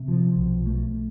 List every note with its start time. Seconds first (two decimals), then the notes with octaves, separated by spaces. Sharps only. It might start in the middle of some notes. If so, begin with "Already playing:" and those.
Already playing: C3
0.08 F3
0.36 B1
0.66 A3